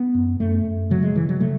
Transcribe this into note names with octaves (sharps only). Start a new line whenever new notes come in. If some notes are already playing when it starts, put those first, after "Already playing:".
Already playing: B3
F#2
F#2 A3
F#2
C#3 F#3
G#3
C#3 E3
F#3
C#3 A3